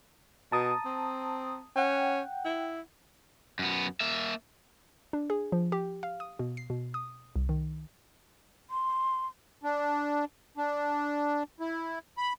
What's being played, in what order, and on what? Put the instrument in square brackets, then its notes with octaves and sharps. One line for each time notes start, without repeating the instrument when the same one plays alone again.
[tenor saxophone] B2 [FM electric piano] A5 A#5 D#6
[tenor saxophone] C4
[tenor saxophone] C#4 [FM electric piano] F#5 G5
[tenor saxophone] E4
[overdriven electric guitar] F#2 B3
A#3 E5
[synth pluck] D4
G#4
F3
G4
F5
D#6
B2
C7
B2
D#6
C2
D#3
[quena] C6
[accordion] D4
D4
E4
B5